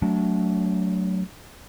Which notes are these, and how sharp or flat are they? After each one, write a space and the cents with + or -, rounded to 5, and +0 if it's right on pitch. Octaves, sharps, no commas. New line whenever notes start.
F#3 +10 A3 +0 D4 -30